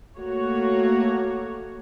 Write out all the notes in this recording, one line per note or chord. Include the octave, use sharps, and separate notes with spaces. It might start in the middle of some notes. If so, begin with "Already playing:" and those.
A3 A#3 F#4 C#5